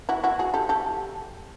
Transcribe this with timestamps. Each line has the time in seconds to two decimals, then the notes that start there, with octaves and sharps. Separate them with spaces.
0.09 E4 F#4
0.24 E4 F#4
0.39 F#4 G#4
0.54 G4 A4
0.69 G4 A4